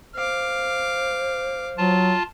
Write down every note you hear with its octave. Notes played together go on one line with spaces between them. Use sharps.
C5 F5 D6
F#3 F4 A5